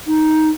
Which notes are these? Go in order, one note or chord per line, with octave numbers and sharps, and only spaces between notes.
D#4